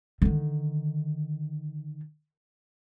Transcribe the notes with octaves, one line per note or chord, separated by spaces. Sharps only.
D3 D#3